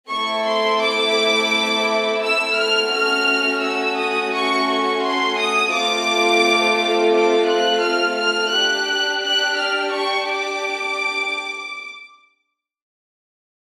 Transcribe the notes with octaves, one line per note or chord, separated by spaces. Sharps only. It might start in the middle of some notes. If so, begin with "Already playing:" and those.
A3 C4 E4 A4 C#6
C6
D6
E6
F6
A3 C#4 F#4 F6
E6
D#6
C#6
C#6
C6
D#6
A3 C4 F4 A4 D6
D6
F#6
F6
F6
D4 G4 F#6
F#6
F6
C#6
D6